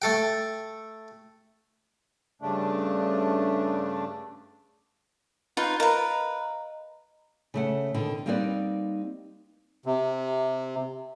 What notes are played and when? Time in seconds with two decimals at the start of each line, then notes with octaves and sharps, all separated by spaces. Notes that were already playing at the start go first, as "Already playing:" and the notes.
0.02 A3 A4 G5
2.42 G2 C#3 A3 D4
5.57 D#4 F4 B4
5.80 A#4 B4 D#5 F5 A#5
7.54 C#3 A3 F#5
7.94 B2 D3 D#3
8.26 G3 A#3 C4 D#4 B4 D5
9.86 C3